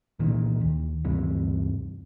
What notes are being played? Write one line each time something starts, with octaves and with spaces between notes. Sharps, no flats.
C2 A#2 D#3 E3
D#2
D2 G2 C3 E3